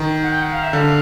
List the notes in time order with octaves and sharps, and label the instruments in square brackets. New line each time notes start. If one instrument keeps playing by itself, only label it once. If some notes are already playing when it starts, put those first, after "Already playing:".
Already playing: [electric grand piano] D#3
[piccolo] F#5
G5
F#5
F5
E5
[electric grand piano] D3 [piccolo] F5